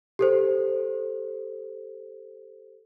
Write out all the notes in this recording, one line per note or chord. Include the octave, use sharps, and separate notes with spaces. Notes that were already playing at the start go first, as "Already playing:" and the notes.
G4 A4 C5